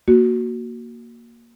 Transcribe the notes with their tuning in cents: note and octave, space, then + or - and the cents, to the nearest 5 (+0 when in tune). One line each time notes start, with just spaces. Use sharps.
A#3 +5 F#4 +0